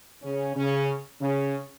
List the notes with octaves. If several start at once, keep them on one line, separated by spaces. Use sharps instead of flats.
C#3 C#4
C#3 C#4
C#3 C#4